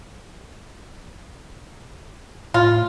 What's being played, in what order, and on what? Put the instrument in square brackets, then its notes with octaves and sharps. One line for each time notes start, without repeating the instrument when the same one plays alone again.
[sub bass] A2 [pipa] F4